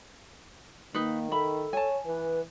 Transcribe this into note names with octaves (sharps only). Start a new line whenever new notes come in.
D#3 A#3 D#4 B4
A4 E5 B5
C#5 G#5 A5
E3 B4